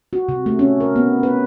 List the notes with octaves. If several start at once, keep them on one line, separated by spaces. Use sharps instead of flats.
F#4
C3
A3
C#4
A#4
B3
B4